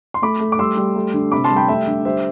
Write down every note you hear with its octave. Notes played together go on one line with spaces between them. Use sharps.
C6
A3 B5 D6
A3
D6
G3 C6 E6
G3
A3
D3
C3 B5 D6
A5 C6
G3
G5 B5
A3 E5 G5
D3
G3 C5 E5